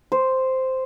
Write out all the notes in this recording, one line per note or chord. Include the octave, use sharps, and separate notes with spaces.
C5